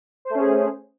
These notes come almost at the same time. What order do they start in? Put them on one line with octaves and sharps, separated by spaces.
C5 A3 C#4 G#4